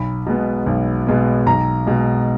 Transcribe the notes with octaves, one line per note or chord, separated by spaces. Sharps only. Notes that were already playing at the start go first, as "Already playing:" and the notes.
Already playing: B1 B5
B2 G#3 B3
B1
B2 G#3 B3
B1 A#5
B2 G#3